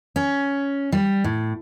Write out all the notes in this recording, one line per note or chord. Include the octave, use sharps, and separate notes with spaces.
C#4
G3
A2